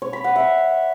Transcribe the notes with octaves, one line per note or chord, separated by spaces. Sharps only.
C#5
B5
F#5
E5